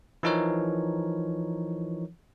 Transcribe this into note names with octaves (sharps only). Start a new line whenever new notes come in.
E3 F3 D#4 A#4 C#5